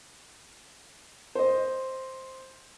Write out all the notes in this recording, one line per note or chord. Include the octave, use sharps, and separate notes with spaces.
C5 D#5